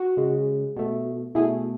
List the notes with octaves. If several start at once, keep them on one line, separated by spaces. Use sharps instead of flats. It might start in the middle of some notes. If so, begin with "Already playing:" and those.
Already playing: F#4
C#3 G#3
B2 A3
B2 A3 E4 G#4